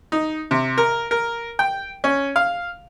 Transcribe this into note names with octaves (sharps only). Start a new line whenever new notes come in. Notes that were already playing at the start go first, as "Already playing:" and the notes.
D#4
C3
A#4
A#4
G5
C#4
F5